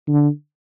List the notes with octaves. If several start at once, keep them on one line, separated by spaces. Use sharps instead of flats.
D3